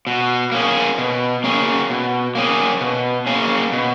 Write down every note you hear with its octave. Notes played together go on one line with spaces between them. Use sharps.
B2
A#3 C#4 G#4
B2
A#3 C#4 G#4
B2
A#3 C#4 G#4
B2
A#3 C#4 G#4
B2